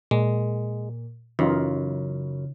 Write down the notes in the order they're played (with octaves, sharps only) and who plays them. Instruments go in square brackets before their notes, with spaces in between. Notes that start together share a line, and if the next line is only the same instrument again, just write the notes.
[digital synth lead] A#2 [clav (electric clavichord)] G#3
[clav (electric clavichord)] F#2 [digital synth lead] C#3 [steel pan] E3 D#4 F4